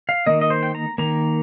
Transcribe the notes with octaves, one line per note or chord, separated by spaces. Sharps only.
F5
D#3 A#3 D#5
D#5
C5
G5
A#5
D#3 A#3 A#5